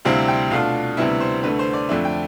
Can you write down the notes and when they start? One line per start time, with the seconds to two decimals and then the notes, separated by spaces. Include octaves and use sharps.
0.05 D2 C3 G3 C4 E4 F5
0.28 G5
0.51 B2 A3 D4 F4 F5
0.97 D2 C3 G3 B3 E4 E5
1.20 C5
1.43 D2 D3 A3 B4
1.59 C5
1.73 D5
1.89 F2 D3 A3 D4 E5
2.05 G5